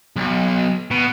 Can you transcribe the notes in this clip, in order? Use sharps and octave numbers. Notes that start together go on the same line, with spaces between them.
B1
B2